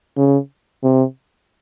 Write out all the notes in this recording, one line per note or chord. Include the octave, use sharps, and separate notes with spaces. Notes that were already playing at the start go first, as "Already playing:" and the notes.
C#3
C3